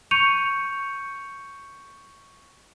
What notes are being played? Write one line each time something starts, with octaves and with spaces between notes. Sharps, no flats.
C#6 G6 C#7 D#7 F7